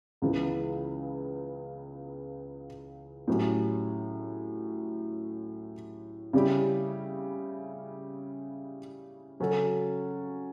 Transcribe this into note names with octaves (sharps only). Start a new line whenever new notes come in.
C#2 C#3 E3 B3
A2 F#3 C#4 G4
C#3 G3 C#4 E4 G4
C#3 F#3 C#4 F#4 A4